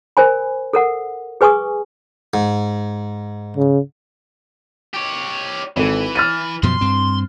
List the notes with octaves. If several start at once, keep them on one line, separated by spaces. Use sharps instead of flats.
A#4 C5 G#5 B5
A4 A#4 F#5
G#4 B4 G#5 C#6 D#6
G#2
C#3
G4 C#5
G#1 E3 A4
F6 A6 D#7
F#2 B2 F3 C6
G2 C4